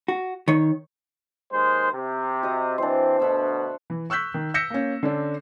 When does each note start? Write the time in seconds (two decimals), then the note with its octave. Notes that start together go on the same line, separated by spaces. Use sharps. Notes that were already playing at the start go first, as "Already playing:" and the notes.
0.08 F#4
0.48 D#3 C#5
1.51 D#2 G#3 C5
1.91 C3
2.43 F#4 D#5 D#6
2.78 E3 C4 D4 C5
3.20 D2 B2 E5 F#5 E6
3.90 E3
4.10 C#6 E6 F#6 G6 B6
4.34 D#3
4.54 E6 G6 A#6 B6 C#7 E7
4.70 A#3 C#4
5.03 D3 C#4 D4